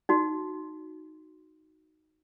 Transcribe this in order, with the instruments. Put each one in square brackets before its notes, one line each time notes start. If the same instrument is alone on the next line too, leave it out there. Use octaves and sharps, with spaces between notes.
[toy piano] D#4 F#4